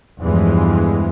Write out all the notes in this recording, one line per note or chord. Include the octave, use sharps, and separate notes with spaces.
E2 G2 E3 F3 G#3